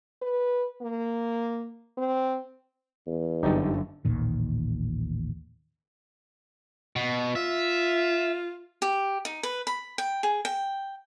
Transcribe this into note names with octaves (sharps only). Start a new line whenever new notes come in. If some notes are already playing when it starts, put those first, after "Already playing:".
B4
A#3
C4
E2
G1 F#2 D3 G3 D#4 G4
A1 D#2 A#2 D#3
B2
F4 E5
G4
D#4
B4
B5
G5
G#4
G5